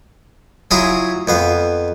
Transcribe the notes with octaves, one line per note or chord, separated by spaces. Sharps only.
F#3 E4 F4 G#4 A#5 D#6
F2 B3 F5